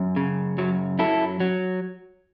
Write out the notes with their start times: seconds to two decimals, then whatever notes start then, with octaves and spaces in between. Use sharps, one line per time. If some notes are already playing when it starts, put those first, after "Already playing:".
Already playing: F#2
0.16 C#3
0.58 F#2 F#3
0.99 F#3 E4 A4
1.40 F#3